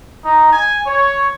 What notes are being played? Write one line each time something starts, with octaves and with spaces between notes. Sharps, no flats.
D#4
G#5
C#5